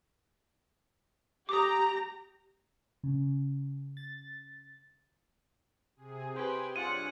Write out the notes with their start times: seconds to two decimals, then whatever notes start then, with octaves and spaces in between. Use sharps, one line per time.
1.49 G4 A#5 D6 D#6
3.03 C#3
3.97 A6
5.96 C3 G#4
6.35 G4 G#4 B4 C5 G#5 G#6
6.76 G2 F4 G#4 C#5 D5 F#5 D#7